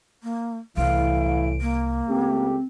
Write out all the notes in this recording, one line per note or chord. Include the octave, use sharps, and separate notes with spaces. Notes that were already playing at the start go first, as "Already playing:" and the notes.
A#3
C2 A2 E3 F5 D7
A#3
C#2 A3 C4 G4